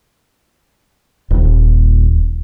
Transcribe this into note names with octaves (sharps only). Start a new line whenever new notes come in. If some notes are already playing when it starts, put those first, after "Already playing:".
D#1